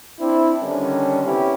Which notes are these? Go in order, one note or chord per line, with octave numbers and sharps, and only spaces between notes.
C4 D4 E4
D3 D#3 G3 C#4
C3 B3 C#4 E4 G4